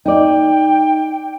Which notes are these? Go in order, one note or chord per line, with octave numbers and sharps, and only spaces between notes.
D#4 D5 G5